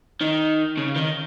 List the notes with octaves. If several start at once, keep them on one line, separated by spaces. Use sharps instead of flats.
D#3
C#3
D#3